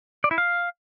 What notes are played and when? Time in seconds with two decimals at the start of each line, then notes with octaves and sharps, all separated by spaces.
0.24 D5
0.31 E4
0.38 F5